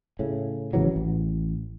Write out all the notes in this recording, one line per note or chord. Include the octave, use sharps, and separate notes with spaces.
A2 C#3
G#1 C#3 E3 F#3
A1